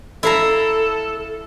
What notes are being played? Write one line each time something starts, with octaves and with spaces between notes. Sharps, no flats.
E4 A4 F5 A#5